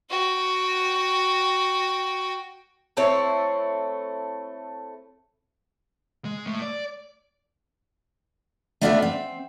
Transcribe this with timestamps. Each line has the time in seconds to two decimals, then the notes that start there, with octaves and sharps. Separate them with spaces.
0.10 F#4 G5
2.97 A3 C4 E4 C#5
6.25 G#3
6.47 A2
6.62 D5
8.81 A3 B3 D4 F4 D#5 E5
9.02 C4